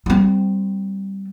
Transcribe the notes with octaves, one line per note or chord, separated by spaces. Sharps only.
G3 C4